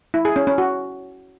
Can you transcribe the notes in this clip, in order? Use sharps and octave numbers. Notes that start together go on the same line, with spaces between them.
E4
G#4
C#4
C#4
F#4